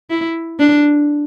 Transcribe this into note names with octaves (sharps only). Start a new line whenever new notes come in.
E4
D4